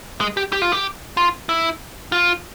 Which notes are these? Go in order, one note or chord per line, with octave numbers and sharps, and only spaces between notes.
G#3
G4
G4
F4
G4
F4
E4
F4